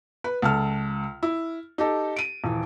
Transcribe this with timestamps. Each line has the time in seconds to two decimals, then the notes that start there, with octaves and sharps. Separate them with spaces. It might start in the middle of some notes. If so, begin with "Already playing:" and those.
0.24 B4
0.42 C#2 A4 F6
1.23 E4
1.78 D#4 G4 A4
2.16 D7 D#7
2.44 D#1 E3